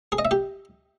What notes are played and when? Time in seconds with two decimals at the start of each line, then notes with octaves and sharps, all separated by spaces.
0.12 G#4
0.18 D#5
0.25 E5
0.31 G4